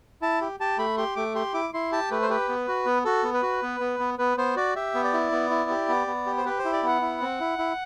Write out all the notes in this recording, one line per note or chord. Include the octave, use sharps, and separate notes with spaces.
E4 A5
G4
G4 A5
A3 B5
G4 C6
A3 D6
G4 C6
E4 D6
E4 C6
G4 A5
A3 B4
C5
G4 B4
B3
F#4
B3
F#4 A4
B3
B4
F#4
B3
B3
B3
B3 B4
B3 C5
F#4 D5
G4 E5
B3
D5
E4
B3
E4
G4
B3
B3
G4
C5
G4 B4
C5
E4
D5
B3 F#5
E4
C4
E4
E4